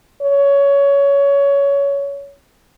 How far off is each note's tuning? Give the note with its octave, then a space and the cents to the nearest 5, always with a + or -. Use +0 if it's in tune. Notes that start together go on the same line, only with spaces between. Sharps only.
C#5 +20